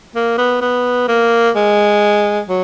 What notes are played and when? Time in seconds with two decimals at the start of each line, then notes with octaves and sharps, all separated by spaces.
0.15 A#3
0.38 B3
0.61 B3
1.08 A#3
1.56 G#3
2.49 F#3